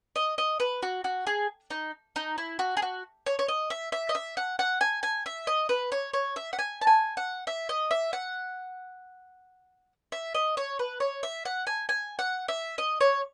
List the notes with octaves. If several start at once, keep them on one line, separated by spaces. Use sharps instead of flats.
D#5
D#5
B4
F#4
F#4
G#4
D#4
D#4
E4
F#4
G#4
F#4
C#5
C#5
D#5
E5
E5
D#5
E5
F#5
F#5
G#5
G#5
E5
D#5
B4
C#5
C#5
E5
F#5
G#5
A5
G#5
F#5
E5
D#5
E5
F#5
E5
D#5
C#5
B4
C#5
E5
F#5
G#5
G#5
F#5
E5
D#5
C#5